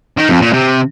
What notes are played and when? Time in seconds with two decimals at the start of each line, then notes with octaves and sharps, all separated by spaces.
0.17 D#3
0.29 F2
0.41 A#2
0.53 C3